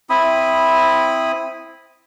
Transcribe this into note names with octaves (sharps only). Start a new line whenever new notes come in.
C4 E4 B5 D#6